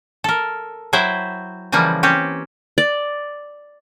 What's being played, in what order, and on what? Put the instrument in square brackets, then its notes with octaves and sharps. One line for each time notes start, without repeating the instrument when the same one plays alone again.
[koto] A4 A#4
F#3 E4 C5 E5 G5
C#3 E3 F3 G3 A#3
C4 C#4 G4
[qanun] D5